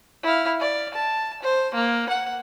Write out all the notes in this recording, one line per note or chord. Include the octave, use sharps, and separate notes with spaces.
E4 F5
D5
A5
C5
A#3
F#5